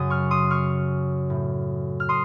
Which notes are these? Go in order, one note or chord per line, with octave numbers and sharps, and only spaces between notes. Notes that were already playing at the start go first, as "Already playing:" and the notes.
Already playing: F#2 C#3 D#6
C#6 F6
C6 D#6
C#6 F6
A2
F6
C6 D#6